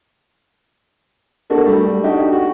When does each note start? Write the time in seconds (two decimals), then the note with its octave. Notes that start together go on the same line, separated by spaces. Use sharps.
1.50 A#3 D4 F#4 A4 A#4
1.66 G3 A3
2.03 D4 D#4 F#4 G4
2.32 F#4